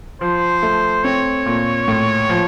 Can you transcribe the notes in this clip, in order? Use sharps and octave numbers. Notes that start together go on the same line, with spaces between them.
F3 C5
A3
C4 C#5
A#2
A2
F3